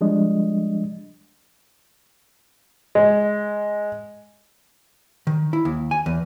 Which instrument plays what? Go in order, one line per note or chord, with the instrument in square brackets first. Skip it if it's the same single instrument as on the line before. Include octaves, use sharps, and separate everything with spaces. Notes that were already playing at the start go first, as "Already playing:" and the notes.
[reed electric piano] F3 G3 G#3 D4 D#5
[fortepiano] G#3
[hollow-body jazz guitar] D#3
E4
D#2
G#5
E2